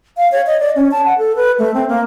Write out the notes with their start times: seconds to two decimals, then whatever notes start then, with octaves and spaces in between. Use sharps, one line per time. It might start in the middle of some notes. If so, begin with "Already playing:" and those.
0.17 F5
0.32 C#5
0.47 D#5
0.60 D5
0.76 C#4
0.91 A5
1.05 F#5
1.18 A4
1.36 B4
1.59 A3
1.74 C4
1.89 A#3